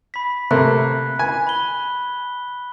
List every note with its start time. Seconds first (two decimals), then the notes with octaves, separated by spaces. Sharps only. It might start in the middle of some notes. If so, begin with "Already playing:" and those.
0.14 B5 B6
0.51 C3 A3 A#3 F#6
1.19 G#5
1.47 B5 G7